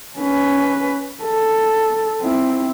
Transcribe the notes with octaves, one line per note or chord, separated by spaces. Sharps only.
C#4 B4
A4
C4 E4